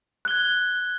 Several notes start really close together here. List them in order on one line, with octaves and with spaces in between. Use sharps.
F#6 G7 G#6